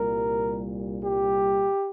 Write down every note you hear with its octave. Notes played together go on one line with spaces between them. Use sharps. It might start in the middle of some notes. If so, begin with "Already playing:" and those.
Already playing: C2 A#2 G3 A#4
G4